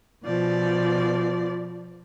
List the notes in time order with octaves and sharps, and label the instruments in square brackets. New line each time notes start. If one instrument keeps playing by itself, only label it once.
[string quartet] B2 F3 D5